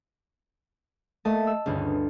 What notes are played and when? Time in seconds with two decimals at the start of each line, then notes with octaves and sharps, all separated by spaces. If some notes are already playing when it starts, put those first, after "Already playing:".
1.25 A3 A#3 D#5 A5
1.47 E6
1.66 G1 D2 C#3 B4